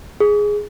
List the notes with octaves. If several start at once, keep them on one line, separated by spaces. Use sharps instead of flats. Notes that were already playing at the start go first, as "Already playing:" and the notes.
G#4